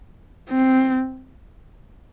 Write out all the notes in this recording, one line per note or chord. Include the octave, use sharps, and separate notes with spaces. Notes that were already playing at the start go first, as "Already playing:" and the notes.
C4